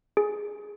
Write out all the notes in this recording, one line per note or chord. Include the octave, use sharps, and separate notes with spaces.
G#4